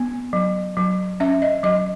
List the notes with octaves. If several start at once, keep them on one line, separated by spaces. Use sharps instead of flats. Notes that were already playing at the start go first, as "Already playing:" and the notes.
Already playing: B3
F#3
F#3
C#4 E5
D#5
F#3 D#5